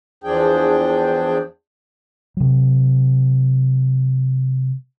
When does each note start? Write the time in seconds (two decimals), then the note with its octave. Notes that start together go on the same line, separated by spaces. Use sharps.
0.24 E2 F3 D4 G#4 G5
2.37 C3 F#3